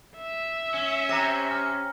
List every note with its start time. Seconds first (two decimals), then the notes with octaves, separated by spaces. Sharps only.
0.18 E5
0.74 C#4
1.09 C3 A#5 A#6 C#7
1.51 F6